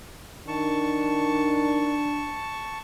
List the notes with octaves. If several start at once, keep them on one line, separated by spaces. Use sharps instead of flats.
D#3 D4 A5 C#6